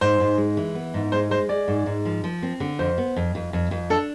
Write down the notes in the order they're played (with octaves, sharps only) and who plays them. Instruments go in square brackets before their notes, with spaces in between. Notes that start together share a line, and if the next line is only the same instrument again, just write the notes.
[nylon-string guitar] G#2 [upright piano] C5
[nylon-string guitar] G#2
G#3
E3
B3
G#2
[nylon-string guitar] G#3 [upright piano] C5
[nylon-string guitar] G#3 [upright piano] C5
[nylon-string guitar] G#3 [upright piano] D5
[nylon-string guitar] G#2
G#2
F3
F3
C4
D3
[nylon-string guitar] F2 [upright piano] C5
[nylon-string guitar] B3
F2
F2
F2
F2
[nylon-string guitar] D4 [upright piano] A4